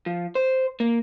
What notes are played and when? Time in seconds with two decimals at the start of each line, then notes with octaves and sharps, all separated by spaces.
0.06 F3
0.35 C5
0.80 A#3